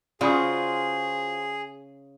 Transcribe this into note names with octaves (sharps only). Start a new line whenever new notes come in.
C#3 F4 F#4 G#4 C5 D5 B5 D#6